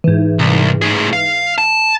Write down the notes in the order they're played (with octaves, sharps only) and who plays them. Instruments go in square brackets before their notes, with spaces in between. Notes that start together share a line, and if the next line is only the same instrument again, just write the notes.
[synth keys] G#2 E3
[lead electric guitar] C2
A2 G#4
F5
A5